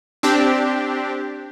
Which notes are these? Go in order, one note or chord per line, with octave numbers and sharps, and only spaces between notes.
C4 D4 G4